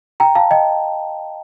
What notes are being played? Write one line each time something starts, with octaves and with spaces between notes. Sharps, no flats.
G5 A#5
F5 A5
D#5 G5